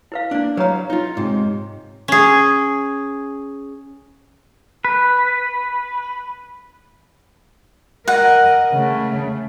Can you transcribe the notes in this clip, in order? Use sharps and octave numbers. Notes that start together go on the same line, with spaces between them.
E4 B4 F5
A#3 D4
F#3 B4 C#5 F5 A#5
D#4 F4
G#2 C3
C#4 G#4
B4
A#4 D#5 F#5
C#3 A3